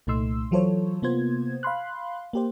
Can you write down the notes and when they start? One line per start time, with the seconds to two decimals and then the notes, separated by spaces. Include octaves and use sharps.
0.07 C2 A#2 A3 D#4 C6 E6
0.51 E3 F#3 F4 A4 C5 C#5
1.02 C3 A#3 B3 F4 C5 G#6
1.63 F5 B5 C6 F#6
2.33 A#3 G4 C5